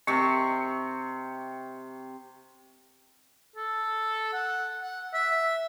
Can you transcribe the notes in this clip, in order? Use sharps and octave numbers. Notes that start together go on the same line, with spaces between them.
C3 C#6
A4
F#5
F#5
E5